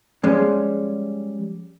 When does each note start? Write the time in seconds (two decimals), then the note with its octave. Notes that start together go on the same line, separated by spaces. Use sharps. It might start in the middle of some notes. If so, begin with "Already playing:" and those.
0.23 F3 G3 G#3 C#4